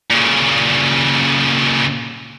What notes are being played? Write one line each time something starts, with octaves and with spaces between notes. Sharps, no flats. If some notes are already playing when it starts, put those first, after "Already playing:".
A#2 C#3